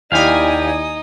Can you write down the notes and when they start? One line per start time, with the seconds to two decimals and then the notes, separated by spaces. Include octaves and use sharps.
0.12 D#2 D#4 E4 G4 D5 F5 G#5 D#6